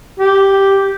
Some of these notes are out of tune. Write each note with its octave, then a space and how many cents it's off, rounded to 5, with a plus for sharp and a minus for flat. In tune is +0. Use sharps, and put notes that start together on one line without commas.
G4 -5